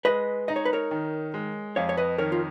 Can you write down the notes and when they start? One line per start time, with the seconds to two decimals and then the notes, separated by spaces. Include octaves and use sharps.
0.05 G#3 B4 D#5
0.48 D#4 D#5
0.56 C#5
0.65 B4
0.73 A#4 C#5
0.91 D#3
1.34 G#3
1.76 F2 C#5 F5
1.89 C#5
1.97 B4 D#5
2.18 D#3 A#4 C#5
2.32 F4